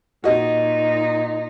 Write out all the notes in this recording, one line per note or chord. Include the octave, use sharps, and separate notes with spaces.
A#2 D#4 F#4 D#5